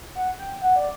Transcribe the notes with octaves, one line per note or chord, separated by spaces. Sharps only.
F#5
G5
F#5
D5